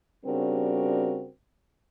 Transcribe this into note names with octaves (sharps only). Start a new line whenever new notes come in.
C#3 G3 C4 D4 F#4 A#4